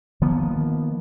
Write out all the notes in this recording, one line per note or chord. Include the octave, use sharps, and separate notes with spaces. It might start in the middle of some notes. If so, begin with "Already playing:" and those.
D#3 F3 A#3 B3